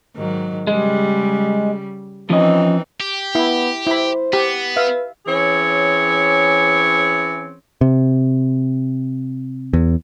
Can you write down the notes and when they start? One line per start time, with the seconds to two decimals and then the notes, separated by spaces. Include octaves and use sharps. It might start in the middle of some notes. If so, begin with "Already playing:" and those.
0.16 G#2 D#3 F#3
0.67 C#3 G3 G#3
2.30 E3 F3 C4 C#4 D#4 D#5
3.00 G4
3.35 B3 E4
3.87 E4 C5 B5
4.33 B3 G4
4.76 B4 E5 F5
5.26 E3 C4 C#4 G#4 C#5
7.81 C3
9.73 E2